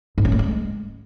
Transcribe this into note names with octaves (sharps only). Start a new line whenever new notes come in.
G#2
C#4
A3
G#3